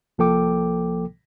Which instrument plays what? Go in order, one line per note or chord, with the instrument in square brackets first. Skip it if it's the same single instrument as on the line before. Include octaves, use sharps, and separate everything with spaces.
[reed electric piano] C2 F3 A#3 A4 G5 D6